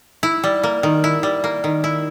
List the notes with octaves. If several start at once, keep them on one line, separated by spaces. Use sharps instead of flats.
E4
G3
A#3
D#3
E4
G3
A#3
D#3
E4